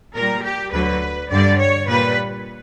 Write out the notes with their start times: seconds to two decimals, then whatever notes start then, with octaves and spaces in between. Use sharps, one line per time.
0.15 A#2 G3 A#4
0.43 G4
0.72 D2 D3 F#3 B4
1.30 G2 D3 G3 D5
1.59 C#5
1.88 A#2 G3 B4